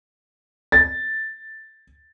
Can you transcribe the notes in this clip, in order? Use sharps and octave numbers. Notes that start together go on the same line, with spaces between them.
A6